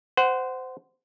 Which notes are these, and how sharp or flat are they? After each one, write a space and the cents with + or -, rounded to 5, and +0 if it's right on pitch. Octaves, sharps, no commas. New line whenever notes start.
C5 -20 F#5 +10